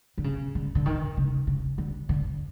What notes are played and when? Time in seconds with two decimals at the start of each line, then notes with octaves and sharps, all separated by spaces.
0.18 D3
0.24 C#3
0.55 D3
0.75 D3
0.86 D#3
1.17 C#3
1.47 C#3
1.78 D3
2.09 D3